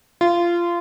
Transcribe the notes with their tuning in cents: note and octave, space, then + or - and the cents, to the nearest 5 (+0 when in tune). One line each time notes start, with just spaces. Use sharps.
F4 -20